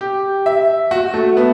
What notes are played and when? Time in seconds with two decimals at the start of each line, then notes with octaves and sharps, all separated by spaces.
0.01 G4
0.46 E5
0.91 F#4
1.14 A3
1.37 B3